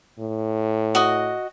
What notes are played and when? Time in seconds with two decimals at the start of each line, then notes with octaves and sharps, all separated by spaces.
0.20 A2
0.95 F#4 D#5